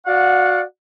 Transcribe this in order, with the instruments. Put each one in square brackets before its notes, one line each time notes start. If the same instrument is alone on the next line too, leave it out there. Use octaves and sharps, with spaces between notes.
[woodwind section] F#4 D5 F5 F#5